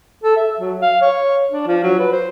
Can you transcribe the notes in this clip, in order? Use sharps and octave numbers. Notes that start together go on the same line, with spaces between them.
A4
E5
F#3
F5
C#5
D4
F3
F#3
B4
C5